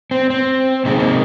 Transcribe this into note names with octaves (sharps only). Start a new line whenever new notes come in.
C4
C4
C3 D#3 G#3 C4
A#3